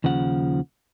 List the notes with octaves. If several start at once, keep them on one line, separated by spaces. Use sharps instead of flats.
D#2 C#3 F3 F#5